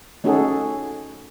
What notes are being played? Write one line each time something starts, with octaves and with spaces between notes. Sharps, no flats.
A3 C#4 D#4 F#4 G#4 A4